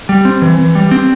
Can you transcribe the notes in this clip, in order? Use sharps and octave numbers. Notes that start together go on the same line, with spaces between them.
G3
C4
E3
E3
G3
C4